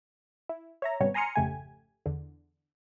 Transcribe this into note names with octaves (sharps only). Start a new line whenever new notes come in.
E4
C#5 E5 A#5
G#1 C3 G3 B3 C#4 C#5
G#5 A#5 C6 D#6 F6 C#7
G#1 F2 C#3 A3 G4 G#5
E2 D3